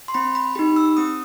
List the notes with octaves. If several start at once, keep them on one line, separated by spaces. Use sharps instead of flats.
C6
C4 B5
B5
D#4 G4 B5
E6
C4 D#6